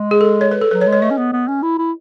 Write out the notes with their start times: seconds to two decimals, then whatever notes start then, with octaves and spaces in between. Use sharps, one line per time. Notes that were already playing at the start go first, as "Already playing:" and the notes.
Already playing: G#3
0.11 G#4
0.21 A4
0.41 C#5
0.51 B4
0.61 A4
0.71 F#3 B4
0.81 C#5
0.87 G#3
0.93 C#5
1.02 A3 D#5
1.10 C#4
1.18 B3
1.33 B3
1.48 C#4
1.63 E4
1.78 E4